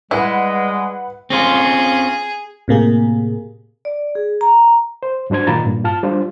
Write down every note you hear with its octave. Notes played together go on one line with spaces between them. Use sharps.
G3 G#3 E4 B4 F#5
C4 C#4 F4 G#4
A2 C3 A#3 G#4
D5
G#4
A#5
C5
G2 F#3 D4 C5 G#6
A#2 D#3 F4 A#5 B5 A6
G2 A#2
F4 A5 F6
G3 D4 F4 C5